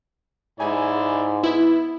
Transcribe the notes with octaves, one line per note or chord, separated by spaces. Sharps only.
G#2 E4 D5 G#5
B3 E4